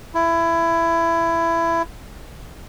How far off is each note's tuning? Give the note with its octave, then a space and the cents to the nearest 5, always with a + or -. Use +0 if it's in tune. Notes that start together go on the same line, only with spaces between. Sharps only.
E4 +20